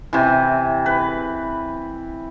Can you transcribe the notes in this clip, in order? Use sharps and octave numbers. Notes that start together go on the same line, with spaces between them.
C3 E3
B4